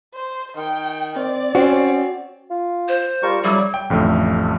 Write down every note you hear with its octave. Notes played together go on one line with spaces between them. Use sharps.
C5
D#3 G5
C4 D5
C4 C#4 F#4
F4
C5
G3 F4 A#4 C#6
C#3 F#3 G3 E4 D5
G5
A1 F2 D3 A3